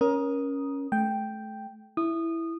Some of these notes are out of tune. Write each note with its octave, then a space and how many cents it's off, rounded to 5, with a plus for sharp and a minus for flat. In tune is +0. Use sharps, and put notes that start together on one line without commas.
C#4 +0 A#4 +25 D#6 +0
A3 -30 G5 +0
E4 +0 D#6 -20